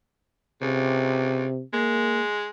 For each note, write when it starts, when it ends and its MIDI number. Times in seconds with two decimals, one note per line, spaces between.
0.62 1.45 37
0.62 1.61 48
1.73 2.47 56
1.73 2.21 58